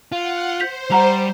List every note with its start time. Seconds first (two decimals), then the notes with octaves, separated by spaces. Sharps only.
0.12 F4 F#5
0.60 C5 G6 B6 F7
0.91 G3 F#5 A#5 F7